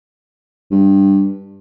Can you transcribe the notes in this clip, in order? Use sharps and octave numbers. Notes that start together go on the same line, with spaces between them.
G2